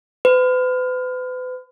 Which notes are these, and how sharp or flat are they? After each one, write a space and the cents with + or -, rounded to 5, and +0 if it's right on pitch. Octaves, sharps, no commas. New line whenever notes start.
B4 +40